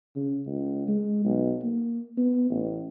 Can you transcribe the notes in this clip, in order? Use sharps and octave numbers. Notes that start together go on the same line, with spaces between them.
C#3
C#2
G#3
B1
A#3
B3
A1